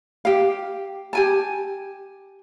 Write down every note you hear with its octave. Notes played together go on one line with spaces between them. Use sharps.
G4 F5
G4 G#5 A5